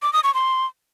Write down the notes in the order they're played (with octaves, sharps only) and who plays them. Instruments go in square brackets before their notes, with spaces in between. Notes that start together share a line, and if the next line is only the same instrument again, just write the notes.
[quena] D6
D#6
C#6
C6